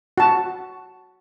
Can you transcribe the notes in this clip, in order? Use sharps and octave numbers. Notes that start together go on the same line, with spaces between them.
F#4 A5